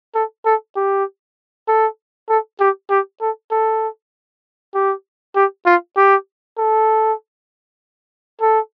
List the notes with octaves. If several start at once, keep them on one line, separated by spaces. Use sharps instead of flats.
A4
A4
G4
A4
A4
G4
G4
A4
A4
G4
G4
F4
G4
A4
A4